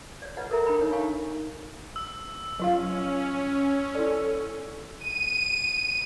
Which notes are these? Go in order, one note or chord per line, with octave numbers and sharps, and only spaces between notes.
C#5 D5
F4 B4 D#5 F#5
A4 A#4 E5 A#5
D4 A#4 G5 B5 C6
D#4 C#5
F5 G5 G#5 C#6
E6
F#3 C#4 F4 F5
E4 A4 D5
D#7